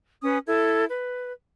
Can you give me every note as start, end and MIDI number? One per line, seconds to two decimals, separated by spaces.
0.23 0.37 61
0.23 0.37 71
0.23 0.37 80
0.23 0.37 87
0.47 0.84 64
0.47 0.84 69
0.47 0.84 92
0.88 1.32 71